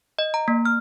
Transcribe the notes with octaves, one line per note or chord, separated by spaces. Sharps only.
D#5
A#5
A#3
F6